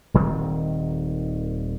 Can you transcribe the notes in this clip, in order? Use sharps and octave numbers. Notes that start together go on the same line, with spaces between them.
D#1 D#3 C4